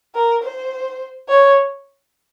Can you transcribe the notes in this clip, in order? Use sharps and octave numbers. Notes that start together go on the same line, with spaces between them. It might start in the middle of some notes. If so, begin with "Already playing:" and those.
A#4
C5
C#5